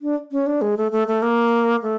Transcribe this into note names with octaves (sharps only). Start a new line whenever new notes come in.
D4
C#4
D4
G#3
A3
A3
A3
A#3
A3